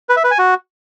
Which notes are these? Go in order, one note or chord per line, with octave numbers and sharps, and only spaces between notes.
B4
E5
B4
G#5
F#4